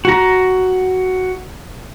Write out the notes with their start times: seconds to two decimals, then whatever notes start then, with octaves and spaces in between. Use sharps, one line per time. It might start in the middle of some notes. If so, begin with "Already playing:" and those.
0.05 F#4 A#5